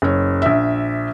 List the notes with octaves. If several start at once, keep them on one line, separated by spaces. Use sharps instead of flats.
F#1 C#5
A#1 E5